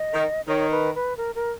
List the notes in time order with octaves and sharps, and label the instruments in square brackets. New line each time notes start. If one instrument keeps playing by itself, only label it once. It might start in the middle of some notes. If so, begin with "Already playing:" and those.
Already playing: [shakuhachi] D#5
[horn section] D#3
[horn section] D#3 [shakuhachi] C#5
[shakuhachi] B4
B4
A#4
A#4